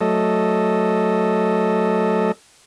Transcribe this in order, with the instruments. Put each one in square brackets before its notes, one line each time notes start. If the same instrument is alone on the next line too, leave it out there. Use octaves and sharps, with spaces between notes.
[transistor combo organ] F#3 A3 A4 D#5